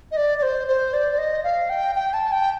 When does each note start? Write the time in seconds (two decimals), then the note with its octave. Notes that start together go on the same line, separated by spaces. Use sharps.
0.11 D#5
0.17 D5
0.39 D5
0.43 C5
0.68 C5
0.94 D5
1.13 D5
1.18 D#5
1.44 F5
1.70 G5
1.95 G5
2.14 A5
2.32 G5